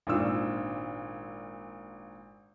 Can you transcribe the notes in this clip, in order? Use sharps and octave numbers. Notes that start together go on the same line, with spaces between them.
G#1 A#2 D4 E6